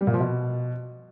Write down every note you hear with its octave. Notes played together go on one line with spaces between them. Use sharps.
G3
A#2
F3
B2